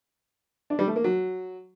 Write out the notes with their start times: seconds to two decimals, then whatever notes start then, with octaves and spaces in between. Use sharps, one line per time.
0.70 D4
0.79 G3
0.87 A3
0.96 A#3
1.04 F#3